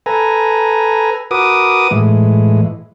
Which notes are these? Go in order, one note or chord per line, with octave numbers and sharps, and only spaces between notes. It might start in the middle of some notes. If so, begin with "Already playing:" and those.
A4 B4 G#5 A#5
F#4 A#4 B4 D6 D#6
A2 E3 G#3